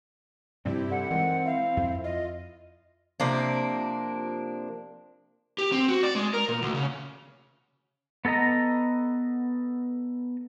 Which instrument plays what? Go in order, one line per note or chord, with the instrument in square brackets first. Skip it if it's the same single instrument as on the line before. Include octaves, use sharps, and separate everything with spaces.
[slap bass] G2 C3 F3 [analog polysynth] C4 E4 G4 [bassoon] D4
[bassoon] D3 [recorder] F#5
[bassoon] D#3 [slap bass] E3 G#3 [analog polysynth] C4
[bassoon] E4 [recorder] F5
[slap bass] F2 [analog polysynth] C4
[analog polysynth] F4 [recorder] D#5
[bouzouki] C3 F3 A#3 D4
[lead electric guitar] G4
C4
F#4
D5
G#3
A#4
A#2
D2
C#3
[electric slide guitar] B3 A4 A#4 D#5 A#5